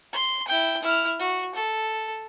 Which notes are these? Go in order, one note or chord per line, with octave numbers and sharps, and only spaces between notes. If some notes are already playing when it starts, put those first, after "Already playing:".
C6
E4 G5
E4 F6
F#4
A4